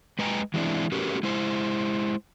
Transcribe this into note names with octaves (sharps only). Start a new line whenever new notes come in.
G#3 B4 D#5 G5 G#5 A#5
E3 G#3 A3 C4 D4 E4
A3 C#4 F#4 G4 A#4 B4
G#3 E4 C5